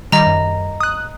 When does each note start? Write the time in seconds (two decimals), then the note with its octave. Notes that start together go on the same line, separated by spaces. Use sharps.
0.12 D#3 G3 D#5 A#5
0.26 F#2
0.80 D#6 F#6